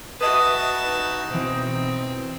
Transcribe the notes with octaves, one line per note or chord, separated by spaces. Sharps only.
F#4 B4 D#5 E5 A5 D#6
D#4
B2 E3 C4